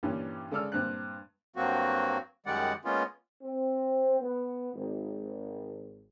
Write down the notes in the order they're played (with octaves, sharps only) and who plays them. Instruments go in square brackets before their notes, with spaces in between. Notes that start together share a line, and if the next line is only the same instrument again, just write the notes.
[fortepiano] G2 A#2 E3 G3 C#4
C#3 G#3 A4 D5 E6 F6
G2 A#2 C4 F#6
[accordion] G2 F#3 A#3 C4 F#4
F#2 D#3 G3 G#3 D5 F#5
G#3 A#3 B3 C#4 F4
[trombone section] C4
B3
G#1